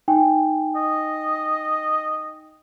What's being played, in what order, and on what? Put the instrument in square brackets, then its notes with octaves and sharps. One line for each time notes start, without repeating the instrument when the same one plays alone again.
[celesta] D#4 G5 G#5
[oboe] D#5